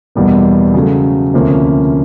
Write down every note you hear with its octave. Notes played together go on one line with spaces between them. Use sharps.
E2 B2 G3 A#3
C#3 F#3 A3
D2 C3 F3 A#3 C#4